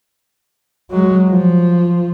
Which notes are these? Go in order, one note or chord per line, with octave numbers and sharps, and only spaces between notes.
F#3 G#3
F3